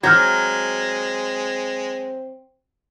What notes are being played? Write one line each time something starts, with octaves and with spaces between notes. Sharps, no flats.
F#3 G#3 C4 F6 G6 G#6